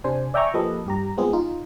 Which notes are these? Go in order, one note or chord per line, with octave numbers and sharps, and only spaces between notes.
C3 D4 C5 G#5
D5 E5 G5 G#5 A#5 C#6
F3 A#3 G4 A4 B4 D#5
G2 G4 A#5
G#3 B3 C4 F4 G#4
D#4 F4